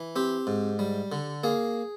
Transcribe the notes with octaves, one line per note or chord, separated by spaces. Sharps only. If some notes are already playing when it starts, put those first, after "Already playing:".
Already playing: E3
C4 G4
G#2
G3
D3
A#3 G#4